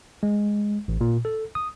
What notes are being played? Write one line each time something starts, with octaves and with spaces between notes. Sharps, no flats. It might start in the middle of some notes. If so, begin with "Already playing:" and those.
G#3
A1
A#2
A4
D#6